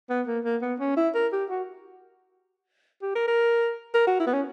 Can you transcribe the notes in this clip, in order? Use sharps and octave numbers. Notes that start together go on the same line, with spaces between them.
B3
A#3
A#3
B3
C#4
E4
A#4
G4
F#4
G4
A#4
A#4
A#4
F#4
E4
B3
C#4